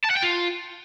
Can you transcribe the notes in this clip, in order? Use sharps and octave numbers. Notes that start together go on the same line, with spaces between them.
A5
F#5
G5
F4